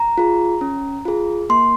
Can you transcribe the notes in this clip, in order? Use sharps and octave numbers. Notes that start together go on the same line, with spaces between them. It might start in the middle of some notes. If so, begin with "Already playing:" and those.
Already playing: A#5
F4 G#4
C#4
F4 G#4
A#3 C6